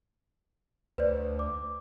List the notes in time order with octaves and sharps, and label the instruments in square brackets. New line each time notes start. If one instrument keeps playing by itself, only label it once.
[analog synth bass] D2 [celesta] B4 C5 D5
[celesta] D6